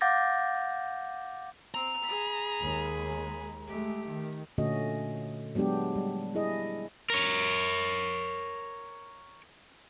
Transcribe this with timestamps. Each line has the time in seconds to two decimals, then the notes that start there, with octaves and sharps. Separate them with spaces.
0.01 F5 F#5 D6 G6 A6 A#6
1.74 C4 A#5
2.03 G#4 B5
2.60 D#2 G#3
3.67 G#3 A3 G4
4.05 D#3
4.58 A#2 D3 A3 C#4 F#4 D#5
5.55 F#3 G#3 B3 D4 G4
5.96 G3
6.35 E4 G#4 D#5
7.10 A#4 C#5